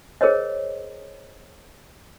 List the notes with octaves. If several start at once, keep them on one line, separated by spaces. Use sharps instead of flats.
G#4 A#4 C5 C#5 D#5